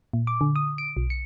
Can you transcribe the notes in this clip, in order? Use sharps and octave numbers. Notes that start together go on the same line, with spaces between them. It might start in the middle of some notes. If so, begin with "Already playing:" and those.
A#2
D6
D3
D#6
D7
B1
C#7